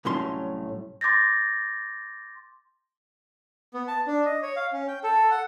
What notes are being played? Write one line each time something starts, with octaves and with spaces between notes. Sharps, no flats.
C2 A2 F#3 C#4 C6
C6 D6 G6 A6 A#6
B3
A5
D4
D#5
C#5
F5
C#4
G5
A4
F#5